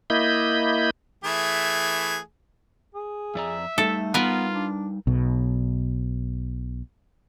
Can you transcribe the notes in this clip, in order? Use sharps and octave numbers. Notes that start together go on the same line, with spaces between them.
A#3 E4 D#5 B5 G6
E3 A3 G#4
G#4
F2 D5 E5 A#5
G3 A3 D#4 A4
B3 F4 A#4 B4
D4
B1 B2